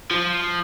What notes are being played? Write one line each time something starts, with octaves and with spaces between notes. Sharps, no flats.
F3